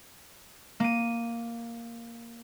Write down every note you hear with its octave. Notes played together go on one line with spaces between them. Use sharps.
A#3 D#7